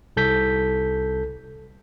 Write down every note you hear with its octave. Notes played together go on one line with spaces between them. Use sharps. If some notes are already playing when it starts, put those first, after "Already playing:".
C2 A4 G6 B6